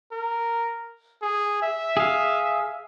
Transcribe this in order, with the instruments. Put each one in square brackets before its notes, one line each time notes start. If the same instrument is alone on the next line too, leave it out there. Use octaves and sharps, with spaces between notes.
[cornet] A#4
G#4
E5
[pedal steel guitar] G#4 F5